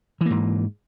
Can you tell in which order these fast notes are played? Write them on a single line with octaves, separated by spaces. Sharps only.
E3 A#3 G#2